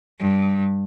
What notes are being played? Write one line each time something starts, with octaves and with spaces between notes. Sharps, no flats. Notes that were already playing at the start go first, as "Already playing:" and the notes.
G2